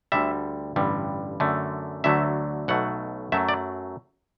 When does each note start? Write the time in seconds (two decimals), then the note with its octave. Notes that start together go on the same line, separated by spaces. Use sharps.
0.12 D2 D3 G3 E5
0.76 A1 G2 D3 G3
1.40 F#2 D3 A3
2.04 D2 D3 F#3 A3 E5
2.68 B1 B2 F#3 A3 F#5
3.32 F#2 F#3 A3 E5
3.49 D5